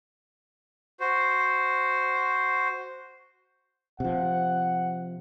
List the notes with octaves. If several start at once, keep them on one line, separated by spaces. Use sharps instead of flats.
F#4 C5
C3 F3 F#5